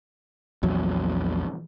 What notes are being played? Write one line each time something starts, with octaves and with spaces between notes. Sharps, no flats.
A#1 E2 F#3